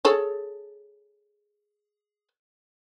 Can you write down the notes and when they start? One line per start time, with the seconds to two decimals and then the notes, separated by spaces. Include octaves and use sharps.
0.05 G#4 A4 C#5